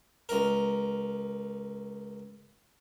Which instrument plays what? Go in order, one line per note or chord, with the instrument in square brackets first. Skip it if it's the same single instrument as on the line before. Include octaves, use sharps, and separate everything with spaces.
[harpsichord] C#2 A#4